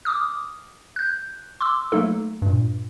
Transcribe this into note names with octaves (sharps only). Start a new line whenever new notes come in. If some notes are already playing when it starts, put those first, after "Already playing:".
D6 D#6 F6
F#6 G6
C6 D6 E6
F#3 A3 A#3 D#4 A4
G2 A#2